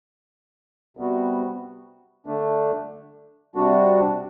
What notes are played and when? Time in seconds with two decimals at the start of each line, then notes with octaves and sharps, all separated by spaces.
0.97 C3 G3 B3 F#4
2.26 D3 A3 D4
3.55 C3 G3 D4 F#4